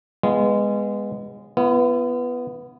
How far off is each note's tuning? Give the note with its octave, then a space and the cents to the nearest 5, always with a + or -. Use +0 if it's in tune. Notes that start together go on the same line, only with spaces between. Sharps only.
G#3 -15 B3 +0 F4 -35
B3 +0 E4 +45